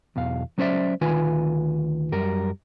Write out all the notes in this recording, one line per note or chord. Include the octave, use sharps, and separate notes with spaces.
B1 E2 F5
F#3 B3 C#4 C5 D5 E5
D2 D#3 F4 B4 G#5
F#2 G3 A#4